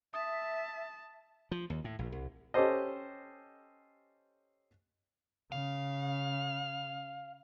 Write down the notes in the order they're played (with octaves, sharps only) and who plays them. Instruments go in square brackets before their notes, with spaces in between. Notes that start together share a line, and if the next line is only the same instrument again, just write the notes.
[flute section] E5 [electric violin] A5 [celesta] D#6
[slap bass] F3
D#2
A2
A#1
C2
[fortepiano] C#4 G4 A4 C5 D#5
[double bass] C#3 [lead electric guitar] F5